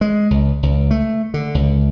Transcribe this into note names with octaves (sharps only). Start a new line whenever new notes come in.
G#3
C#2
C#2
A3
D3
C#2